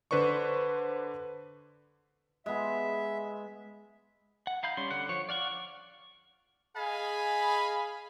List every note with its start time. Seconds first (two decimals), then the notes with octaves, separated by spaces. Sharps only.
0.11 D3 B4 C5 D5 C#6
2.46 G#3 B3 E5
4.47 F#5
4.63 D#4 F5 B5 G6
4.77 G3 C#4 C6
4.91 D3 F#5
5.09 F3 C#5
5.29 D5 F5 F#5 C#6
6.78 G#4 D#5 F5 G#5 B5